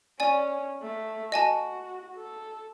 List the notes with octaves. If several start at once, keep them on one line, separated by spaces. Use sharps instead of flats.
C#4 D5 G#5
A3
F#4 D#5 G#5 A5
A4